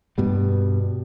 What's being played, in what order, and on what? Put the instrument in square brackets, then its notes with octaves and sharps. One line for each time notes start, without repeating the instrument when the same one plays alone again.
[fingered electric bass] G2 B2 G3